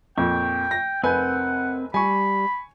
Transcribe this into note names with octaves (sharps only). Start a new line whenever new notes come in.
F2 A#2 G5 C#6
A#6
F1 C4 A#4 B4 F#5 G#5 G6
G3 G#5 B5 C#6